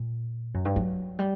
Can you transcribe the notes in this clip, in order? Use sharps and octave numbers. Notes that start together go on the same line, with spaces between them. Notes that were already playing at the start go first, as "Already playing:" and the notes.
Already playing: A#2
F#2
G2
F#3
G3